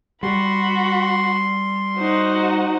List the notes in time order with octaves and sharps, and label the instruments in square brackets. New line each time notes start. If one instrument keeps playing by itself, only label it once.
[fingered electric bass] G3 [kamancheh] F#4 B5 [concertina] C6
[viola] D#4 F#4 [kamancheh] C5 F#5